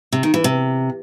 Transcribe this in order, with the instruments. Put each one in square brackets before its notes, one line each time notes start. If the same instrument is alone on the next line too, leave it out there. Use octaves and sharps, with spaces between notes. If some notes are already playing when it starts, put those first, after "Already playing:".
[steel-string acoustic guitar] C3
D#3
E3
C3